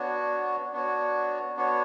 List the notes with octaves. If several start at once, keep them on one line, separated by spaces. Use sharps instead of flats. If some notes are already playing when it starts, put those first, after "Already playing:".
Already playing: B3 D4 F#4 C#5
B3 D4 F#4 C#5
B3 D4 F#4 C#5